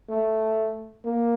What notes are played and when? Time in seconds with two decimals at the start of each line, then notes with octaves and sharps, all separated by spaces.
0.09 A3
1.05 A#3